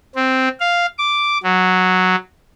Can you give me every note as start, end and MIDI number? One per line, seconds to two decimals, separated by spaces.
0.15 0.48 60
0.60 0.86 77
0.98 1.38 86
1.43 2.15 54